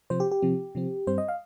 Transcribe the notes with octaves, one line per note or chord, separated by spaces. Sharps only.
C3 F3 C4 C5
G4
G4
C3 F3 C4
C3 F3 C4
G2 G3 C4 C5
D#5
F5